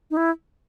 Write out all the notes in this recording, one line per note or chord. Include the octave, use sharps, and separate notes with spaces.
D#4
E4